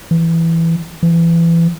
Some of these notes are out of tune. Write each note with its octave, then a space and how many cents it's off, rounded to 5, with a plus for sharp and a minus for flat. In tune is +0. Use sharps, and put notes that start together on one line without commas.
E3 +5
E3 +25